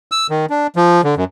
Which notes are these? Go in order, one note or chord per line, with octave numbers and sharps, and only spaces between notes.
E6
D#3
D4
F3
D3
F#2